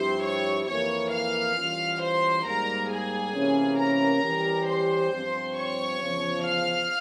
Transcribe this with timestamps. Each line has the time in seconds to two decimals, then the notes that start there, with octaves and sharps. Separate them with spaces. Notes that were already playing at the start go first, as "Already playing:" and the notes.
Already playing: G2 F3 C4 E4 G4 C5 C6
0.23 C#5 C#6
0.67 F2 E3 A#3 C#5 C#6
1.12 F5 F6
1.57 E3 G3 C#4 F4
2.01 C5 C6
2.46 G#2 G3 A#3 A#4 A#5
2.89 G#4 G#5
3.34 C3 E3 A#3 C#4
3.79 A#4 A#5
4.24 E3 G3 C#4 G4
4.68 C5 C6
5.12 G2 F3 C4
5.56 C#5 C#6
6.01 E2 C#3 F3
6.46 F5 F6